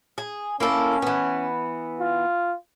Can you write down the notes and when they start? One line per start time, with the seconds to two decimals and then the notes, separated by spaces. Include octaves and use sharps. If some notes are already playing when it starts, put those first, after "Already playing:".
0.18 G#4
0.60 A#3 C#4 E4 A4
1.02 E3 B3
2.00 F4